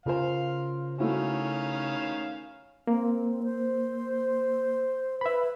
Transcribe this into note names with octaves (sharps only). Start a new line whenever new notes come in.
C#3 F4 A#4 C5 F5
D#3 A3 C#4 E4 F#4 F5
A#3 C4
C5
B4 E5 B5